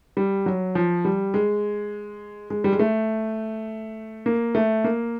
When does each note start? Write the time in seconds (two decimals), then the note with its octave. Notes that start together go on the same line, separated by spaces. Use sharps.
0.17 G3
0.46 F#3
0.75 F3
1.05 G3
1.34 G#3
2.50 G#3
2.64 G3
2.72 G#3
2.79 A3
4.26 A#3
4.55 A3
4.84 A#3